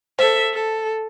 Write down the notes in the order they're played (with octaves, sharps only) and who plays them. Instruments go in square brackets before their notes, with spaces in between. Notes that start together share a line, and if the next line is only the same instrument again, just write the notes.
[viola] A4 E5 [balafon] C5
[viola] A4